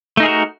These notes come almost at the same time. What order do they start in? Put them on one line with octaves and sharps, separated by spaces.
A3 D#4 G#4 A#4 F#4